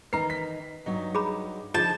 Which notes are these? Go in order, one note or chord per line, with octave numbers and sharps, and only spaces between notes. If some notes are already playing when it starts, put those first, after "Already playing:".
D#3 E3 D#4 B4 A#5 C7
B6
G2 F#3 D#4 F#4
G#4 A#5 B5
D3 F3 D#4 F4 G#4 A5 G6